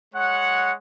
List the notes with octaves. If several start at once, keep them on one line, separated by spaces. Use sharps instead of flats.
G#3 C#5 F#5